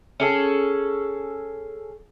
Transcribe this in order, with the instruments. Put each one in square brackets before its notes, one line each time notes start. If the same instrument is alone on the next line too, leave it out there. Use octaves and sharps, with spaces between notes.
[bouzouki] C#4 G#4 A4